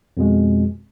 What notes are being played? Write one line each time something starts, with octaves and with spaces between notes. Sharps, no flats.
F2 B2 G#3